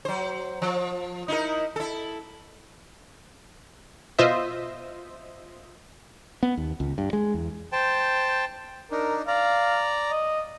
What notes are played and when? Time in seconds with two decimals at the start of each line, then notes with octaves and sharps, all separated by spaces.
0.05 F#3 C5
0.62 F3
1.28 D#4 E4 A#4
1.76 E4 A4
4.19 B2 F4 C5 D#5 E5
6.43 B3
6.57 D#2
6.80 C#2
6.98 G2
7.13 G#3
7.34 E2
7.72 C5 G5 A5
8.91 D4 D#4 A#4
9.27 D5 F5 A#5
10.10 D#5